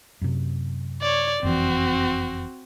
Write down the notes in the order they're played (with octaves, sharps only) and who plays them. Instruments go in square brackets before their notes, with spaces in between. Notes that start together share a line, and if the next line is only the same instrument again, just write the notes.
[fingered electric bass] F#2 C3
[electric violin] C#5 D5
[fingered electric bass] F#1 F2 E3 [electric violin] C4 F#4